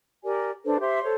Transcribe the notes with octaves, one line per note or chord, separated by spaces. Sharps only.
G4 A#4 D5 G#5
D4 A4 B4 C5
G4 C5 E5 C6
A4 C5 C#5